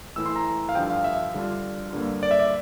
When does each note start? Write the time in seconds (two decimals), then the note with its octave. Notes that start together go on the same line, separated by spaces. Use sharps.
0.16 A2 E3 A3 E4 E6
0.26 C6
0.36 A#5
0.69 F5
0.75 G2 D3 F3 G5
0.90 F5
1.04 E5
1.34 D3 G3 D4 F4
1.93 G2 D3 G3 A#3
2.23 D5
2.31 E5
2.40 D5